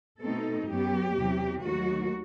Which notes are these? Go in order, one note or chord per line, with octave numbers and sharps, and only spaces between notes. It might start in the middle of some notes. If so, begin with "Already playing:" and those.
B2 A3 C4 D#4 A4
F#2 F#3 B3 G4
E2 C3 F#3
D#2 D#3 F#3 A3 F#4